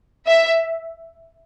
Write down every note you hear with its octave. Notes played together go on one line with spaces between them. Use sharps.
E5